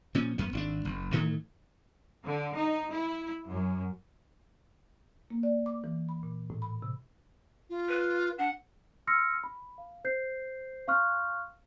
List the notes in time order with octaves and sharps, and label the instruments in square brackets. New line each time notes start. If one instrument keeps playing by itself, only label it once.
[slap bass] A#2 F3 C#4
F#2 B3
G#1 C#4 D4
F#1
A2 D#3 E3 A3
[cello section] D3
D#4
E4
F#2
[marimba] A#3
D5
D6
E3
B5
A#2
A2
B5
C3
[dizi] F4
[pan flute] B4
[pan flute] D4 [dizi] F#5
[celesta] C6 E6 F6 A#6 C#7
B5
F5
C5 G6 C7
F5 C6 C#6 F6 F#6